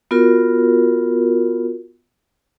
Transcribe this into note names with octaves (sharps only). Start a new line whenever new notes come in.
B3 F4 F#4 A#4